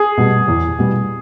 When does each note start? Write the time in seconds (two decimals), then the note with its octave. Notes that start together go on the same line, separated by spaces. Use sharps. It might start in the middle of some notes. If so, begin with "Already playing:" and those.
Already playing: G#4
0.17 B2 G3
0.48 E2
0.79 B2 G3